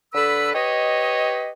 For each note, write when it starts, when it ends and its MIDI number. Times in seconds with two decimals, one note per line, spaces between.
0.13 0.52 50
0.13 0.52 69
0.13 0.52 71
0.13 0.52 83
0.13 0.52 88
0.53 1.50 67
0.53 1.50 71
0.53 1.50 73
0.53 1.50 75